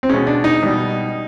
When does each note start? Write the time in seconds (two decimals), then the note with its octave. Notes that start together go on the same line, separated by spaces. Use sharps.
0.03 C4
0.09 B2 G#3 C#4
0.27 D4
0.44 D#4
0.63 B2 G3